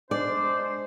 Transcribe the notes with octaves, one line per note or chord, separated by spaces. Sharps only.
G#3 D4 C5 D5